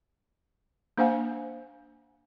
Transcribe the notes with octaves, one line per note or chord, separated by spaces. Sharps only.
A#3 D4 C5 F5 F#5 G#5